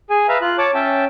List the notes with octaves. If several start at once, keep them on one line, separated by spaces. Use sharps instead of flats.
G#4 G#5
B4 E5 F5 A#5
F4 F#6
C#5 A5 D6
C#4 E5 G5 A5